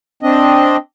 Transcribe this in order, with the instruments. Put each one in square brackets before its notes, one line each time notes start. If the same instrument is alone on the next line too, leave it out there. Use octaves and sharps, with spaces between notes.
[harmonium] C4 D4 D#5